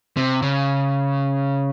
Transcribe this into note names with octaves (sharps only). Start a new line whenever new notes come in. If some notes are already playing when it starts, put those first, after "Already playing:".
C3
C#3